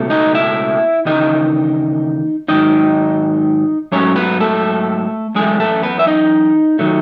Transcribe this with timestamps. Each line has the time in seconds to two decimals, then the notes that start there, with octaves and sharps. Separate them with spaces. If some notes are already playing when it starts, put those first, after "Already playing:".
Already playing: C#2 B2 A3
0.10 D#4 D#5
0.35 E4 E5
1.05 D#2 C#3 E3 D#4 D#5
2.48 G#2 D#3 F#3 D#4 D#5
3.92 G#2 F#3 A3 C#4 C#5
4.16 B3 B4
4.40 A3 A4
5.35 F#2 E3 G#3 A3 G#4
5.60 A3 A4
5.83 B3 B4
5.99 E5
6.07 D#4 D#5
6.79 D#3 F#3 A3